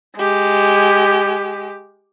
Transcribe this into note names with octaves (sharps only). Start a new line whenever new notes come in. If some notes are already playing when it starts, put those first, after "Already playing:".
G#3 G4